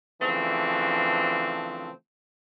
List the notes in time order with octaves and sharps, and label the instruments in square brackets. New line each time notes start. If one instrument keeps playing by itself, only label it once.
[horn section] C#3 E3 F3 A3 C4 D4